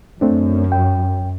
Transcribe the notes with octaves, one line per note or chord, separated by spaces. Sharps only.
F#2 A3 C4 D4
G5